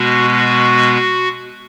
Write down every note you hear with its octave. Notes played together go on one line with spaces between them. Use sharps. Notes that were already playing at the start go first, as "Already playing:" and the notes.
Already playing: B2 G#3 B3 F#4
F#4